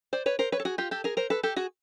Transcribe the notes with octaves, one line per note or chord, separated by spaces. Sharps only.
C5 D5
B4 C#5
A#4 C5
B4 C#5
A4
F#4 G#4
F4 G4
G4 A4
G#4 A#4
A#4 C5
A4 B4
G4 A4
F#4 G#4